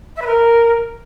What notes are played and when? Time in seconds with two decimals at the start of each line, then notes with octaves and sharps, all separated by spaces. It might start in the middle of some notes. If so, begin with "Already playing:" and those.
0.16 E5
0.21 B4
0.26 A#4